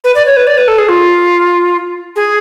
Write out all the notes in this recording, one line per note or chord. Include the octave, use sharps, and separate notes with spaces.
B4
D5
C#5
B4
D5
B4
A4
G#4
F4
G#4